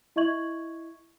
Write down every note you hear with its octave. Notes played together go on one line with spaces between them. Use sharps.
E4 D#5 E5 C#6 G#6 F#7